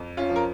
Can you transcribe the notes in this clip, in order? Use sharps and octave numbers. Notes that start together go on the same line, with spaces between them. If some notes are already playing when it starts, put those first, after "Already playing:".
Already playing: F2
C#4 F4
F3
A#4